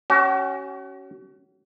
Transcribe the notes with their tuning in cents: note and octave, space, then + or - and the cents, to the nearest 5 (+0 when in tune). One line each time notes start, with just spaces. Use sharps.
C#4 +0 F#4 +40 A5 -5